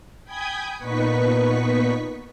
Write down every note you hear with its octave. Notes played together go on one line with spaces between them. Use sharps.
G5 G#5 B5 D#6 G6 G#6
A#2 B3 D#4 B4 C#6 B6